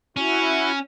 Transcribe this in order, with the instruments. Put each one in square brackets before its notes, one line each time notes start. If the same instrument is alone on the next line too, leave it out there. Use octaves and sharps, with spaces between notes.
[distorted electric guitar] C#4 [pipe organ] E4 F#4